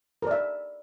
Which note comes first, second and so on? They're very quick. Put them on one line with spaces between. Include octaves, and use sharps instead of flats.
A#4 D5 E5